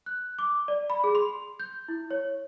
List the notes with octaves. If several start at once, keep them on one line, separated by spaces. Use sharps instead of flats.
F#6
D6
D5
B5
G#4
C6
G6
E4
C#5